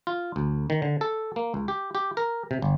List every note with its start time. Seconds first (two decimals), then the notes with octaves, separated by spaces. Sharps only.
0.07 F4
0.36 D2
0.70 D#3
0.82 D3
1.01 A4
1.36 A#3
1.54 C#2
1.68 G4
1.95 G4
2.17 A#4
2.51 C3
2.62 G1